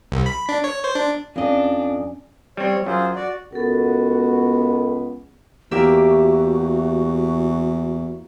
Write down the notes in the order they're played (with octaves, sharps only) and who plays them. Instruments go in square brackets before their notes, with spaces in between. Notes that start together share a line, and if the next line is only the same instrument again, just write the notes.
[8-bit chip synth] C2
B5
D4
C#5
C5
D4
[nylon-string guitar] F2 D#5 [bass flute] C#4 [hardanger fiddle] D4
[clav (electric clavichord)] G3 C4 [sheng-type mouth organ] C#5
[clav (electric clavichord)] F#2 [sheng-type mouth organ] F4 G#4 C5
[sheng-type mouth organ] F#4 D5
[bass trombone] C#2 [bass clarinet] B3 [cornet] F#4 [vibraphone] A4 A#4
[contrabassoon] E2 [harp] A#3 G4 E5 [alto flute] F#4